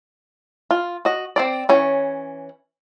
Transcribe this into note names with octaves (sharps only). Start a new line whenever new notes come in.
F4
F#4 D#5
C4 C5 D5
E3 C#4 C#5